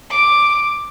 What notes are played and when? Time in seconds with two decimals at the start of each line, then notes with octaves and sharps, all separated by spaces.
0.10 D6